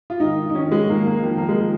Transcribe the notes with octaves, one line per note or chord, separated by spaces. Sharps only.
F4
G#2 D#3 D#4
D#4
F2 D#3 C#4
G#3
G#2 D#3 A#3
A#3
F2 D#3 F3
A#3
G#3
D#3 F3